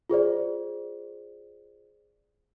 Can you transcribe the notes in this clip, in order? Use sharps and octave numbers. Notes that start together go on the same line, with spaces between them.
F4 G#4 C5 D5